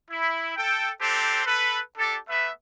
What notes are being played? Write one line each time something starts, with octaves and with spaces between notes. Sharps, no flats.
E4
A4 G5
C4 D4 G4 A4 C5
A4 B4
D4 G4 A4
A3 B3 B4 E5